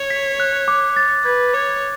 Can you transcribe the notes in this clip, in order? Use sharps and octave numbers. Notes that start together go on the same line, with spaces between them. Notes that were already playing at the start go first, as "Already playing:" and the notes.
Already playing: C#5
B6
F#6
D6
A6
B4 G#6
C#5 D6